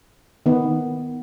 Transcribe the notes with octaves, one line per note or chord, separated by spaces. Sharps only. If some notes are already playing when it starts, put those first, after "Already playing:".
D#3 B3